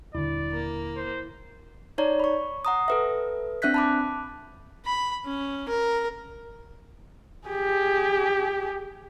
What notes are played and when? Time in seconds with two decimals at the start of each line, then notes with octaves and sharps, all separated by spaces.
0.15 D#1 D3 E4 D5
0.51 A#3
0.96 C5
1.98 D#4 C#5 D5 A#5
2.20 B5 C#6
2.65 F#5 A#5 D#6
2.88 A4 B4 E5
3.62 C4 D4 E5 F#6 G6 B6
3.74 A5 B5 D6
4.86 B5
5.25 C#4
5.69 A#4
7.48 G4 G#4